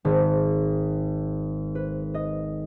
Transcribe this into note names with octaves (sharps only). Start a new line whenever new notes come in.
G#1
B4
D#5